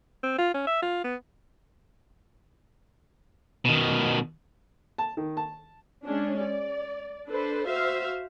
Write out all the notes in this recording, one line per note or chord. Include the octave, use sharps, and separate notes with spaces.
C4
F4
C#4
E5
F4
B3
B2 D#3
A5
D#3
A5
G#3 C#4 D4
D5
D4 A4 B4 C5
F#4 C5 E5 F5